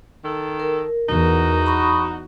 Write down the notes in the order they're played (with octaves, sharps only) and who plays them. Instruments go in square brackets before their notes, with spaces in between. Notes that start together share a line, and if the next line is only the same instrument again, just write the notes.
[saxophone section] D#3 A4
[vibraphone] A#4
[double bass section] E2 [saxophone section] D#4 F#4
[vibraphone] B5 C#6 D#6